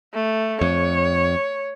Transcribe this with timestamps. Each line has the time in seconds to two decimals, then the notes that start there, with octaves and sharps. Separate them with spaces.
0.15 A3
0.61 F2 C#5